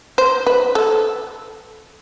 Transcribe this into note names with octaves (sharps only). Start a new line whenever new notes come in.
C5
B4
A4